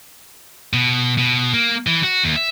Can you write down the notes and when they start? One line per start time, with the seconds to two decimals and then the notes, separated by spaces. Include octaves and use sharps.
0.73 B2
1.18 B2
1.54 A#3
1.87 E3
2.03 F#4
2.24 D#2
2.36 E5